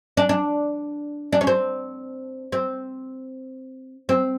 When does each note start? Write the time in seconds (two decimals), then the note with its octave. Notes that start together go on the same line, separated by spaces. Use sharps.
0.17 D4
0.29 D4
1.33 D4
1.41 C#4
1.47 C4
2.52 C4
4.09 C4